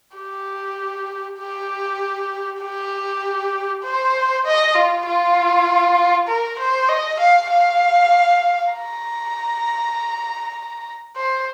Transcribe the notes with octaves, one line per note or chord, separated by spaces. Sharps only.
G4
G4
G4
C5
D#5
F4
F4
A#4
C5
D#5
F5
F5
A#5
C5